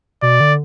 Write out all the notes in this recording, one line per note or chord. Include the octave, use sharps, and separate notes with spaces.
B2 D5
D3